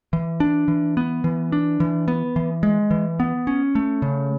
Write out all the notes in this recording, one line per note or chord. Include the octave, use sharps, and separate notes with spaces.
E3
D4
E3
B3
E3
D4
E3
B3
E3
G#3
E3
B3
C#4
A3
C#3